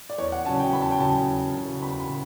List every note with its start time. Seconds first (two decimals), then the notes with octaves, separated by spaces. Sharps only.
0.10 D5
0.18 E2 C#5
0.32 F#5
0.46 C#3 F#3 C#4 A5
0.60 G5
0.73 E2 B5
0.81 A5
0.91 G5
1.00 C#3 F#3 C#4 A5
1.28 E2
1.55 C#3 F#3 C#4
1.82 E2 B5
2.00 B5
2.09 C#3